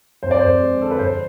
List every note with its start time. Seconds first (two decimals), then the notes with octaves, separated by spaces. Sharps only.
0.23 F2 C5
0.31 D5
0.40 F2 C5
0.60 G#3
0.79 D3 A4
0.91 B4
0.99 F2 C5